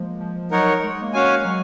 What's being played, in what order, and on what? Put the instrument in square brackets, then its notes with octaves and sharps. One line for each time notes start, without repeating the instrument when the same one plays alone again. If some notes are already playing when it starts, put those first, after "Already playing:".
Already playing: [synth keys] F3 G#3 A#3
F3
[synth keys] F#3 [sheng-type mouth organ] D#4 A#4 C#5 F#5
[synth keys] G#3
A#3
[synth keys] G#3 [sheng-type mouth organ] C#4 F#4 C#5 F5 G#5
[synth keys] F#3